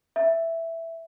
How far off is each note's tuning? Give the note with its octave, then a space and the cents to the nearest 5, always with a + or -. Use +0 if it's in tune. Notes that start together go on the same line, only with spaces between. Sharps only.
E5 +5